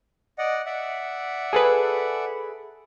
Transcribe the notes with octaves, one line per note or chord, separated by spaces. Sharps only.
D5 D#5 F#5
D5 E5 F#5
G#4 A4 B4